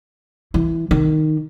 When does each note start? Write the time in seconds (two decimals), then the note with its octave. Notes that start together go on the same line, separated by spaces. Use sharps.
0.54 E3
0.91 D#3